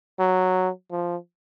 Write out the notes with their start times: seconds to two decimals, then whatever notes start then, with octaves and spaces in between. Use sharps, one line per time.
0.19 F#3
0.91 F3